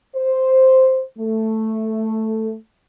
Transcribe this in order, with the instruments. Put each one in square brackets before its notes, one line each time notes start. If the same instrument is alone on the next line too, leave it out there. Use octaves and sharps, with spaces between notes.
[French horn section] C5
A3